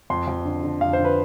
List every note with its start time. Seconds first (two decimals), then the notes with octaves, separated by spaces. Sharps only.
0.10 F2 C6
0.28 F2
0.45 D3
0.63 D3
0.81 F2 F5
0.93 C5
0.98 D3
1.05 B4